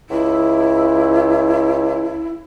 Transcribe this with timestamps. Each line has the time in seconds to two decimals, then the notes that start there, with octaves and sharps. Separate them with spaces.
0.10 C#2 E4